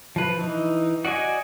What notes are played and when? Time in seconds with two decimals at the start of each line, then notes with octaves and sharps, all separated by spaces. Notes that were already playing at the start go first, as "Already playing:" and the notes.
0.16 F3 B4
0.39 E3 D#4
1.05 F#4 D5 D#5 G#5